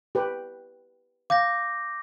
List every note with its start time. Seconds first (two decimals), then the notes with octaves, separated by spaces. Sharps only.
0.15 G4 B4
1.30 F5 D6 G6 A#6